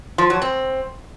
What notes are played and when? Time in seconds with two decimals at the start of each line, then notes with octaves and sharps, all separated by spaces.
0.18 F3
0.30 F#3
0.42 C4